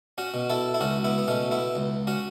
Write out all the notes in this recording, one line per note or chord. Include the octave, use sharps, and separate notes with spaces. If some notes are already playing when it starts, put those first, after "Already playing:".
C#4 F#4
B2
E4 A4
E4
C#2 C#4 F#4
B3 E4
B3
B2 A3 C#4
B3 E4
C#2
C#4 F#4